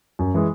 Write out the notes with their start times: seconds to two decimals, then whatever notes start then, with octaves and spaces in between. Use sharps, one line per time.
0.19 F#2
0.34 E3 G#3